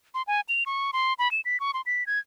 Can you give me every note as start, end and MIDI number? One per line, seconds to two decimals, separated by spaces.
0.14 0.22 84
0.27 0.41 80
0.49 0.64 101
0.66 0.91 85
0.93 1.14 84
1.19 1.31 83
1.31 1.41 100
1.45 1.59 95
1.60 1.71 85
1.74 1.81 84
1.86 2.06 95
2.07 2.19 92